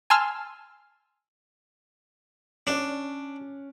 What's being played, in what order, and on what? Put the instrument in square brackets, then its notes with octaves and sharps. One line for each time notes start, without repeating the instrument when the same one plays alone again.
[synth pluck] G#5 A5 C6 E6 F6
[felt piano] C#4 C#5 [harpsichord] D4